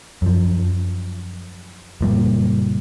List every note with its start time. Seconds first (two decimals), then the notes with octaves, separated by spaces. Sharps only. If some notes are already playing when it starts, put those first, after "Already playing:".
0.22 F#2 F3
2.01 F#1 A#2 G3